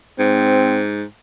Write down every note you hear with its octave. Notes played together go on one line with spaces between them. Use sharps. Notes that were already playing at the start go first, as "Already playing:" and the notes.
G#2 C4